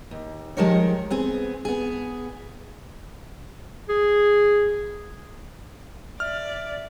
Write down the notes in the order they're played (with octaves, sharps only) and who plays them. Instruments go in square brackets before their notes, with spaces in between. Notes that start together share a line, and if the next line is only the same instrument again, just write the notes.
[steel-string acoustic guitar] D#2
D#3 F3 G#3 G4 A#4 C#5
B3 C4 G#4
B3 G#4
[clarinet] G#4
[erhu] D5 [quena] E5 [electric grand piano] F6